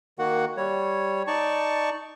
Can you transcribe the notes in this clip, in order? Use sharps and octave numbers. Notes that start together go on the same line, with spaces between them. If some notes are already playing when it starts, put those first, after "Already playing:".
D#3 A#3 F#4 F#5
G3 C#5
D#4 D5 A5 C#6